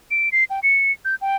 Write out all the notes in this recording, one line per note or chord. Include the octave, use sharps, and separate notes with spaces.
D7
C7
G5
C#7
G6
G5